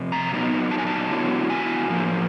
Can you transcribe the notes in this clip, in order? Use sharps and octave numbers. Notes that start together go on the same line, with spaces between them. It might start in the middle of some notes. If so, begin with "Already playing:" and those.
Already playing: F2 C3
A#5
A#2 F#3 B3 D#4
A5
G#5
A5
D3 F#3 B3 E4
G#5
A2 F3 A#3